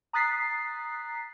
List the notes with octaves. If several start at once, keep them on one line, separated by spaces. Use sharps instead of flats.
A#5 D#6 F#6 A6 B6 C7